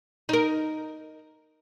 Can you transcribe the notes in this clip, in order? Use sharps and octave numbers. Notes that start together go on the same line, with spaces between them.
D#4 A#4